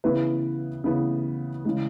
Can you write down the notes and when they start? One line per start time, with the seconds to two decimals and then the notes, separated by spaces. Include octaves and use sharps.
0.04 C#3 E3 B3 E4 B4
0.84 C#3 E3 B3 E4 B4
1.65 C#3 E3 G#3